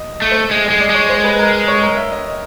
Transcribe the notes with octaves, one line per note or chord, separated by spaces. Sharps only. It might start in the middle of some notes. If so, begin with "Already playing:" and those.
Already playing: D#5
A3
C5
G#3
G#3 D#5
D5
G#3 C#5
C5
B4
A#4
C#5
A#4
E5
D#5